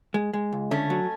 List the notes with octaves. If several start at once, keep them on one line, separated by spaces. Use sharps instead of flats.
G#3
G#3
C#2
D3 A3 C#4
F#3